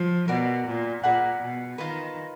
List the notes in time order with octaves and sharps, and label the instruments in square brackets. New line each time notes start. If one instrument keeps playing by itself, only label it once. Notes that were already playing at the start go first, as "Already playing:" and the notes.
Already playing: [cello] F3
[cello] B2 [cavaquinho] A#4 D5 F#5
[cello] A#2
[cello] A#2 [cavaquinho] G#4 D5 F#5 B5
[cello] B2
[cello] D#3 [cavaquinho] F4 B4 D#5